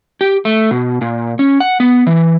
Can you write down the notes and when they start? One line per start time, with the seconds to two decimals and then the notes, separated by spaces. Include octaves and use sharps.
0.21 G4
0.45 A3
0.71 B2
1.01 A#2
1.39 C#4
1.60 F#5
1.80 B3
2.07 E3